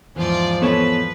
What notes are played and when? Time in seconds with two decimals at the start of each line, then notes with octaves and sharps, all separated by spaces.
0.16 E2 G#2 F3 F4 D5
0.62 B3 A4 B4 C#5